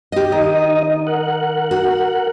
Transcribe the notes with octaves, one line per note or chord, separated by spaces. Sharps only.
G4 D#5
D#3 D#4 D#5
A#4 F#5
F#4